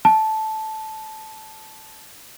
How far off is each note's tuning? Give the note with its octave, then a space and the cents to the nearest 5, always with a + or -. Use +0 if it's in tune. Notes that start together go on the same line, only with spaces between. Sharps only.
A5 -10